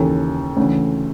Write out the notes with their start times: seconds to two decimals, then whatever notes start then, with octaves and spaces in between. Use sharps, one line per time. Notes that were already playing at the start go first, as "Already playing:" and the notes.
Already playing: D#2 C#3 E3 A4
0.57 D2 C#3 E3